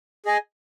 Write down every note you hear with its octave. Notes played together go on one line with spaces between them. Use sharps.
G#4 D#5 G#5